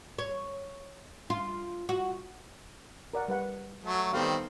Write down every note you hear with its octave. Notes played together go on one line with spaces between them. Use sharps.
C#5
F4
F#4
A#4 D5 F#5
G3 B4 F#5
F#3 A3
D#3 G3 B3 C4 A4 F5